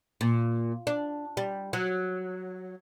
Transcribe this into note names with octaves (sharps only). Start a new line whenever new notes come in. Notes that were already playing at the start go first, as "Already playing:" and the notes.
A#2
D4
G3
F#3